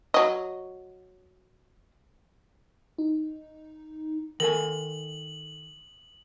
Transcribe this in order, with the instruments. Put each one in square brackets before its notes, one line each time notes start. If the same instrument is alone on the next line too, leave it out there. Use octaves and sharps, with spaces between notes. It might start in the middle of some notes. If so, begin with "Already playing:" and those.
[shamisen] F#3 D#5
[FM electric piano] D#4
[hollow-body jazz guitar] D#3 A4 G#5 [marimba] A#4 [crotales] F#7